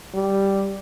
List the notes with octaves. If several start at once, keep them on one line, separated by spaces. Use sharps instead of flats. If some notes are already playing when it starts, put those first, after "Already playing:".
G3